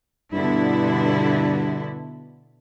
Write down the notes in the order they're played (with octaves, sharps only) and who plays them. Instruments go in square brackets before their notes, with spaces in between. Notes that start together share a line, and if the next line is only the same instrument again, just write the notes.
[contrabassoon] G2 [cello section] B2 D3 E4